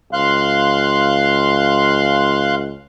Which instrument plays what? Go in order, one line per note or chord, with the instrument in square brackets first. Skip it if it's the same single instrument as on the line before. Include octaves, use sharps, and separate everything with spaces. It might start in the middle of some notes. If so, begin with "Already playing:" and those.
[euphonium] C#2 [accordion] F5 C6 F#6